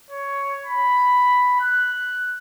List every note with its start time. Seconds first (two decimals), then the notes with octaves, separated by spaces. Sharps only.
0.11 C#5
0.66 B5
1.61 F#6